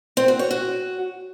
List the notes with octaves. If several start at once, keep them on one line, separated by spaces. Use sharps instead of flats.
C4
F#4
C#5
F#4